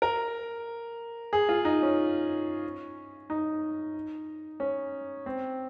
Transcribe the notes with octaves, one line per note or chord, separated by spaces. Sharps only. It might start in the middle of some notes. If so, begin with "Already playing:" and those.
A#4
G#4
F4
D#4
C#4
D#4
C#4
C4